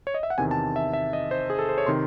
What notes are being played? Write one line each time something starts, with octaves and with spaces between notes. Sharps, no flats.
C#5
D#5
E5
F#5
E2 C3 D#3 G#5
A5
E5
E5
D#5
C5
G#4
A4
C5
C#5
C3 D#3 C6